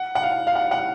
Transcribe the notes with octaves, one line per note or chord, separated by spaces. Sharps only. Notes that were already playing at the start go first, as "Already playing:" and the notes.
Already playing: F#5
F#5
F5
F5
F#5
F#5